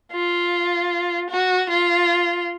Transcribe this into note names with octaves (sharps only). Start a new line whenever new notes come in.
F4
F#4
F4